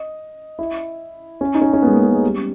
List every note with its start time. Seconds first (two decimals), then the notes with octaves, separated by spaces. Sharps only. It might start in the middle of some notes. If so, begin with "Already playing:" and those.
Already playing: D#5
0.59 E4
1.41 C#4
1.54 D#4
1.61 C#4
1.73 C#4
1.82 G#3 B3
1.93 A#3
2.03 A#3
2.13 G#3
2.23 G3